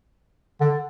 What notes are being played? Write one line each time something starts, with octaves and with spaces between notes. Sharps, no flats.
D3